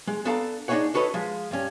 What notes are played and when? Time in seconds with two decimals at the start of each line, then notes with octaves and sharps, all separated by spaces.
0.07 G#3
0.25 B3 D4 A4 F5 A5 A#5
0.68 D4 D#4 F#4 G#4 C#5 F#5
0.94 D4 F#4 A4 B4 C#5 D#5
1.14 F3 G#3
1.51 G2 C#4